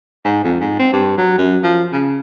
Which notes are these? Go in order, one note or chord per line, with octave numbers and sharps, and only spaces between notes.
G#2
F2
G#2
C4
G2
F#3
F#2
F3
C#3